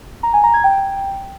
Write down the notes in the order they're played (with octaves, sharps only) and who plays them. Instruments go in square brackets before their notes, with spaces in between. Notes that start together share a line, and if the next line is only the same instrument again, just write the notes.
[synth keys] A#5
G#5
A#5
G#6
G5